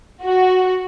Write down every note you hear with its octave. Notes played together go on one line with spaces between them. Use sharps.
F#4